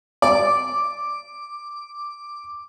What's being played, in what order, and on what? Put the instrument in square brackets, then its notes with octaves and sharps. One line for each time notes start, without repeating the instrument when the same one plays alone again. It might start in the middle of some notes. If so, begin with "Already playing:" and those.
[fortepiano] D5 [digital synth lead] D6